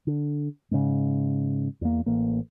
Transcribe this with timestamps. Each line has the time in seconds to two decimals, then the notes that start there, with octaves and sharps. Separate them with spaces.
0.07 D3
0.71 G#2 C#3
1.81 E2 A#3
2.06 A1 A#3